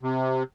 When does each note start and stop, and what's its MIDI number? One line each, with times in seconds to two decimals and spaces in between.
0.03 0.43 48